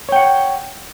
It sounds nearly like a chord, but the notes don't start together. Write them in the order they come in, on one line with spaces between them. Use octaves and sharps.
C#5 G5 F#5